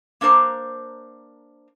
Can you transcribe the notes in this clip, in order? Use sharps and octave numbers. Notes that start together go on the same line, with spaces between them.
A#3 D4 A#4 C5 A#5